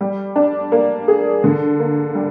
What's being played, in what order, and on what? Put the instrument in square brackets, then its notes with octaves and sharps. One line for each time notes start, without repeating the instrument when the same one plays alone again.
[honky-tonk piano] G3
D4
A#3
G#4
D3
A#3
G3